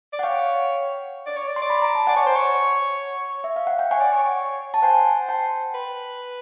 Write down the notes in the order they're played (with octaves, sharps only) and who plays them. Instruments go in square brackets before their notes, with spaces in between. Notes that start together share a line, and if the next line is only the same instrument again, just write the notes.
[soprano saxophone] D5
[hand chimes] F#5
[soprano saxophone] C#5 [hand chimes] F5 G5
[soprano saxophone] D5
C#5
D5
[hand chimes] C6
[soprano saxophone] D5
[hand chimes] B5
A#5
A5
[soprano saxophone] D5 [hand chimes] F#5 G#5
[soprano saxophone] C#5
C5
C#5
[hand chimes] E5
F5
F#5
G5
[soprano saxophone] C#5 [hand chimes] F#5 G#5
[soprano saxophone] D5
C#5
[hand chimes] A5
[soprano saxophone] C5 [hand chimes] F#5 G#5
[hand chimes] G5 A5
[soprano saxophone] B4